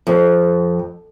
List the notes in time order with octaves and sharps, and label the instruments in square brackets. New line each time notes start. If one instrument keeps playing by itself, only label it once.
[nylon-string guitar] F2